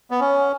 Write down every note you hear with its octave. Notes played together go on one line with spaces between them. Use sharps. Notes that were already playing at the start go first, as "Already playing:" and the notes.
B3
C#4